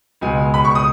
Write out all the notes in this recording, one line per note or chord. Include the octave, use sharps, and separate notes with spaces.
C#2 B2 G#3 G#5
B5
C#6
D#6